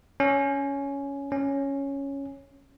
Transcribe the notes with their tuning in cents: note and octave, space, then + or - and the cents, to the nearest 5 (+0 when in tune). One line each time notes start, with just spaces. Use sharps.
C#4 +10
C#4 +0